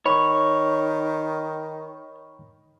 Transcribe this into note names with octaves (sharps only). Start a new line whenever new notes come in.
D#3 C#5 B5 C#6